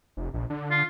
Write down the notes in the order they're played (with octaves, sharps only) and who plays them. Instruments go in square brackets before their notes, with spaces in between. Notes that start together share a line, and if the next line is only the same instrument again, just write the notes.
[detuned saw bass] F1
A#1
D3
[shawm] F4